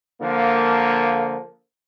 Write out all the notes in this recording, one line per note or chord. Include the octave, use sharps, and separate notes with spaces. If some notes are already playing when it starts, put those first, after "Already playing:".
D3 F3 A#3